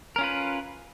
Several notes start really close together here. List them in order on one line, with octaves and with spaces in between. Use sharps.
A#4 C#4 F4 B4